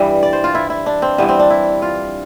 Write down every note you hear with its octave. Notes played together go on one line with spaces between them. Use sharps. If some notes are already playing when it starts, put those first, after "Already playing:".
Already playing: G2 E3 G3
D5
C5
F4
E4
E4
D4
C4
G2 E3 G3 B3
C4
D4
E4
F4